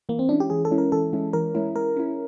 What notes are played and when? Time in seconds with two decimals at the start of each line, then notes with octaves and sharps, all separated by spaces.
0.09 E3 A#3
0.19 C4
0.29 G#3 C#4 D4 E4
0.40 G4
0.50 E3 G#4
0.65 A4
0.71 G#3 C#4 E4
0.78 A#4
0.92 E3 A4
1.13 G#3 C#4 E4
1.33 E3 A#4
1.55 G#3 C#4 E4
1.76 G#3 A#4
1.97 C#4 E4